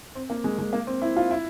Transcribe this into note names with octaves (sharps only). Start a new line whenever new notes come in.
C4
A#3
G#3
G#3
A#3
C4
E4
F4
E4